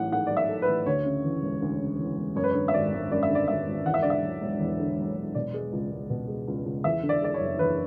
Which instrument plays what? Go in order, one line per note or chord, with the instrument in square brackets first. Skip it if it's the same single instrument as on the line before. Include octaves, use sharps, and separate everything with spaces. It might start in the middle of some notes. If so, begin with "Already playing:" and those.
Already playing: [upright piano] A1 G#2 F#3 A3 F#5
G#2 F#5
F#3 D5
E5
A3
B4
A1
D2 C#5
C#3
E3
E1
D2
C#3
E3
E1
F#2 C#5
B4
D3 C#5
E5
G#1 D5
G#1
F#2 D5
E5
D3 D5
G#1 E5
G#1
E2 F#5
E5
D3 D5
E5
F#3
E1
E2
D3
F#3
E1
B2 D5
G#3
C#2
C#2
B2
G#3
C#2
C#2
E2 E5
D3
D5
G#3 D5
C#5
F#1
E2 B4